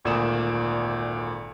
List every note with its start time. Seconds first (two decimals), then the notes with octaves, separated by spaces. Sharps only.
0.05 G#1 D2 A#2 D5 D#6 E7